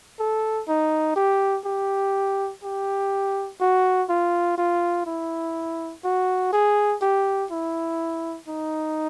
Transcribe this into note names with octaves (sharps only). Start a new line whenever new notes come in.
A4
D#4
G4
G4
G4
F#4
F4
F4
E4
F#4
G#4
G4
E4
D#4